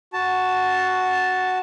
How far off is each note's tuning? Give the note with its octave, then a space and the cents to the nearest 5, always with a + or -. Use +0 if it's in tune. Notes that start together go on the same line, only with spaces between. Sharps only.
F#4 +0 A5 +0